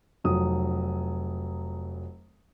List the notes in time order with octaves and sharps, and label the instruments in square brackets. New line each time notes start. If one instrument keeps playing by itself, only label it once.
[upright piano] F1 F#3 D#6